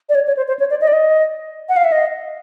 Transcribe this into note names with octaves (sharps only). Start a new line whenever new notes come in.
D5
C#5
C#5
C5
C5
C#5
D5
D#5
D5
D#5
F#5
F5
E5
D#5